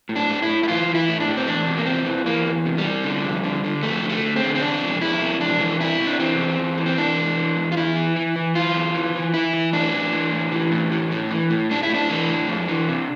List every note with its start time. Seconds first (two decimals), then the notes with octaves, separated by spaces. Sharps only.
0.09 A2
0.16 D4
0.29 A2
0.42 E4
0.49 A2
0.63 E4
0.68 E3 F4
0.88 E3
0.95 E4
1.08 A2
1.20 D4
1.28 A2
1.37 C4
1.47 E2 D4
1.66 C3
1.78 A#3
1.86 E2 C4
2.05 E3
2.26 E3 A#3
2.45 E2
2.66 C3
2.78 G3
2.85 C3
3.04 D3
3.24 F2
3.44 D3
3.64 D3
3.83 F2 A3
4.03 D3
4.10 A3
4.23 D3
4.36 C4
4.42 D3
4.55 C4
4.61 C3 D4
4.82 F2
5.01 F2 E4
5.21 C3
5.40 F2 D4
5.60 E3
5.80 C3 E4
6.00 C3
6.07 D4
6.19 E3 C4
6.39 E2
6.58 E2
6.78 E3
6.86 C4
6.97 E3 D4
7.18 E2
7.37 E3
7.57 E2
7.72 F4
7.77 E2 E4
7.96 E3
8.16 E3
8.36 E3
8.55 E3 F4
8.75 E2
8.95 E3
9.15 E3
9.34 E3 E4
9.53 E3
9.73 A2 D4
9.93 E3
10.12 E3
10.32 A2
10.52 E3
10.72 A2
10.91 E3
11.12 A2
11.31 E3
11.50 A2
11.71 A2 D4
11.83 E4
11.89 A2 D4
12.10 E3
12.29 A2
12.48 F2
12.68 E3
12.89 C3